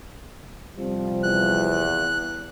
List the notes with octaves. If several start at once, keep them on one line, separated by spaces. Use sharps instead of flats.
C3 F3 G3
E2 F#6